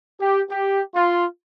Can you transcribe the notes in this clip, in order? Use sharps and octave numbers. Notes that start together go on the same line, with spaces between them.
G4
G4
F4